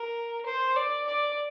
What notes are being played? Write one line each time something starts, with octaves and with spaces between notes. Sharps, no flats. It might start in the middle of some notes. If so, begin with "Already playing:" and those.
Already playing: A#4
C5
D5
D5